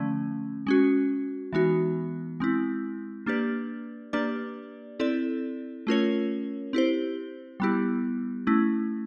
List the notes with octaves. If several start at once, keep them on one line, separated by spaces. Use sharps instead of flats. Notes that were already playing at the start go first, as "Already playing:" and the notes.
Already playing: D3 F3 A3 C#4
G#3 C#4 F#4
E3 G#3 B3 D#4 F#4
G#3 C4 E4
A#3 D4 G4 B4 D5
A#3 D4 G4 B4 D5
C4 E4 A4 D5
A3 C#4 F4 A#4 C#5
C4 E4 G4 C5
G3 B3 E4 G4
A3 C#4 E4